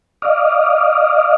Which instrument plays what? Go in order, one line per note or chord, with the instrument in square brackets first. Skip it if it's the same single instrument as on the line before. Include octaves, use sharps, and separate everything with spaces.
[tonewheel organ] D5 D#5 F5